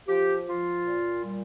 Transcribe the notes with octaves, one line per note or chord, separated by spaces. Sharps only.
F3 G4
F3 F4
A#2
G3